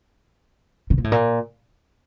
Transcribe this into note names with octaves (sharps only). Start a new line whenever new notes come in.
C#3
A#2
A2
A#2